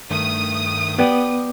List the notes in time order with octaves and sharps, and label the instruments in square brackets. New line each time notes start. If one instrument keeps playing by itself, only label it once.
[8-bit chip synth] G2 D#3 A3 [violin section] D#6
[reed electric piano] B3 [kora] G4 D5 G5